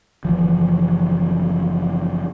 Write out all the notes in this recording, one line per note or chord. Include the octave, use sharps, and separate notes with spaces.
F#1 C#3 E3 F3